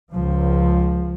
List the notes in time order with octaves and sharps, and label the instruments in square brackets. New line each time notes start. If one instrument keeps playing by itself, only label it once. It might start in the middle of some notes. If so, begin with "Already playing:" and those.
[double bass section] C#2 F3